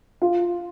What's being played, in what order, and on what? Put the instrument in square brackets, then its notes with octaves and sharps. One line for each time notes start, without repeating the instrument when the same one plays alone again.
[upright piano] F4